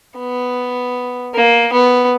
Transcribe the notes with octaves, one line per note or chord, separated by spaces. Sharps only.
B3
A#3
B3